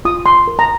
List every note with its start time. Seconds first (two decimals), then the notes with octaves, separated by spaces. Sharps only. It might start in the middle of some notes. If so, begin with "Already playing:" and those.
0.05 F4 D#6
0.26 C6
0.47 A#4
0.59 A#5